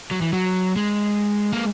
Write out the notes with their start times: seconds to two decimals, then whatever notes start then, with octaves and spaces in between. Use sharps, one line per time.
0.11 F#3
0.22 E3
0.33 F#3
0.76 G#3
1.52 A#3